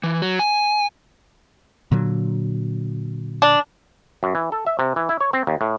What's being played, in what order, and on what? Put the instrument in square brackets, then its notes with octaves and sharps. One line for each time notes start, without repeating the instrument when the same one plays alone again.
[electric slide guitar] E3
F#3
G#5
[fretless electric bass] A#2 D3 F#3
[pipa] D4
[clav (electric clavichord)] F#2
E3
A4
E5
C3
E3
E4
C#5
C4
D#2
A2